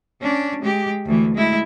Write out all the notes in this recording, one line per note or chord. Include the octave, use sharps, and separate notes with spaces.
C#4 D4
G#3 G4
D2 E3
G#3 E4